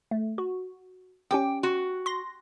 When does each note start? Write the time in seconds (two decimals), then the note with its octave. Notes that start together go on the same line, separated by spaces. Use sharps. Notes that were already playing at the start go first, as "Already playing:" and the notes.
0.11 A3
0.38 F#4
1.31 C#4 G4 G5 D6
1.63 F#4
2.06 C6 A#6